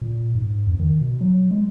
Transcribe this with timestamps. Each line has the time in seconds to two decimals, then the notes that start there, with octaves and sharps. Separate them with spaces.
0.02 A#2
0.35 G#2
0.67 F2
0.80 D#3
1.01 B2
1.21 F#3
1.51 G#3